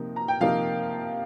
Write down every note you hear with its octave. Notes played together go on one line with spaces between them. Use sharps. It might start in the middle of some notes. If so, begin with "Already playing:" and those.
Already playing: C3 F3 A#3 D#4
A#5
G5
C3 F3 A#3 D#4 F5